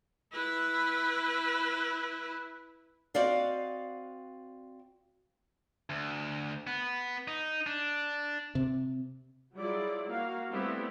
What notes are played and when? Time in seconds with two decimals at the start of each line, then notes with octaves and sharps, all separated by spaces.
0.33 E4 B4
3.14 C4 F#4 D5 D#5 F5 F#5
5.90 D2
6.67 B3
7.28 D#4
7.67 D4
8.55 C3
9.56 F#3 G3 E4 F4 G#4 D5
10.08 A#3 F#4 F5
10.52 G3 A3 B3 C4 E4 G4